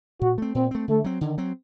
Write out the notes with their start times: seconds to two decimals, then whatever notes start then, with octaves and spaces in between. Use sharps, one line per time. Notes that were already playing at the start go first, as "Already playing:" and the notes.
0.21 A#2 F#4
0.38 A3 C4
0.54 A#2 C4
0.71 A3 C4
0.88 D3 A3
1.04 F#3 C4
1.21 D3 D#3
1.38 F#3 C4